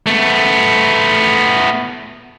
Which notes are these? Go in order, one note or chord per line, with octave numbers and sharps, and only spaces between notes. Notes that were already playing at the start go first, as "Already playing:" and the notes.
A3 B3